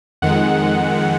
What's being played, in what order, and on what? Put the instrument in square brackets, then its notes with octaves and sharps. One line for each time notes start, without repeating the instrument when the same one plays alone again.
[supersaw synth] F2 D#3 G#3 F#5